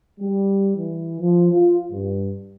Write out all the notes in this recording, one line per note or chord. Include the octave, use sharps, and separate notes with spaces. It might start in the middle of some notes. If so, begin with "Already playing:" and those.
G3
E3
F3
F4
G2